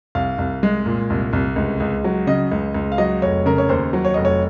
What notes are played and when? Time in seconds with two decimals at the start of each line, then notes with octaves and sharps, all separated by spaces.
0.15 C2 F5
0.38 C2
0.63 G#3
0.86 A#2
1.10 C2
1.33 C2
1.56 C#2
1.80 C#2
2.04 F#3
2.27 C#3 D#5
2.51 C#2
2.74 C#2
2.92 F5
2.98 F#3 D#5
3.22 F1 C#5
3.46 C#3 A#4
3.58 C#5
3.69 D#2 C5
3.93 F#3
4.05 C#5
4.14 F1 D#5
4.25 C#5